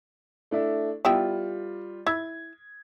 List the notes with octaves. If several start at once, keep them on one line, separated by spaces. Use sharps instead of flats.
A3 D4 E4
G3 B3 E4 F4 G5
E4 G#6